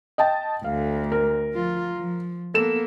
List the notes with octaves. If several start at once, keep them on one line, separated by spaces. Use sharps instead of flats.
D#5 G5 A5
D2 F5
A#4
F3 F4
F3
A#3 B3 A4 E7